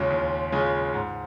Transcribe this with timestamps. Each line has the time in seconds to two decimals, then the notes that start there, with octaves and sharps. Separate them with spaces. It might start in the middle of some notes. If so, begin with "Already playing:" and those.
Already playing: D#2 C#3 G#3 C#4 F4
0.10 D#2
0.52 C#3 G#3 C#4 F4
0.94 G#2